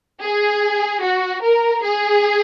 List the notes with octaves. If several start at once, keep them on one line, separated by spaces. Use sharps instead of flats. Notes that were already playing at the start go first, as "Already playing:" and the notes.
G#4
F#4
A#4
G#4